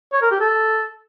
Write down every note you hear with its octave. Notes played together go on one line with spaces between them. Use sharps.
C#5
A#4
G4
A4